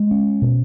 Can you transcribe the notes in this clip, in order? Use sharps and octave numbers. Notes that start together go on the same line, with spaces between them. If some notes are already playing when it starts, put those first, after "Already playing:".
Already playing: G#3
C#4
B2